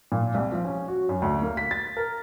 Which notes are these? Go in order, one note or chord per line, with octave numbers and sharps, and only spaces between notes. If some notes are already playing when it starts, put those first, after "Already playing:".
A#2
C2
F3
C#4
F#4
F#2
D2
A#3
B6
A6
A#4